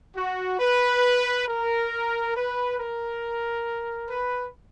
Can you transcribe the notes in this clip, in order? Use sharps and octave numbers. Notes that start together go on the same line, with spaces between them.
F#4
B4
A#4
B4
A#4
B4